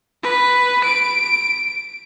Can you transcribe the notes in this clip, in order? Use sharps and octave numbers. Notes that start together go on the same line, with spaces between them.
B4
D7